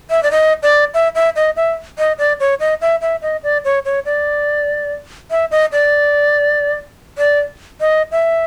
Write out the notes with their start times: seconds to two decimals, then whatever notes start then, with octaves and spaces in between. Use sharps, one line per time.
0.10 E5
0.23 D5
0.31 D#5
0.63 D5
0.94 E5
1.15 E5
1.36 D#5
1.56 E5
1.98 D#5
2.19 D5
2.40 C#5
2.60 D#5
2.81 E5
3.02 E5
3.22 D#5
3.43 D5
3.65 C#5
3.85 C#5
4.05 D5
5.31 E5
5.51 D#5
5.72 D5
7.18 D5
7.81 D#5
8.12 E5